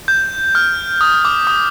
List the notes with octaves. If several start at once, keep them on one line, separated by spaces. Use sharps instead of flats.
G6
F6
D#6
D6
D#6